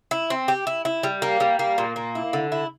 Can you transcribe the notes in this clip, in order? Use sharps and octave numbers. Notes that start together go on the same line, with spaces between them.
E4
C4
G4
E4
E4
G3
A#3
G3
A#3
A#2
A#3
E4
D3
E4